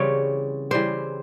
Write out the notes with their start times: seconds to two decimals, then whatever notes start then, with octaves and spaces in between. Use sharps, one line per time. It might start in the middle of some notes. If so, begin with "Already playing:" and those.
Already playing: C#3 E3 G3 C4 C#5
0.71 C#3 E3 G3 C4 C5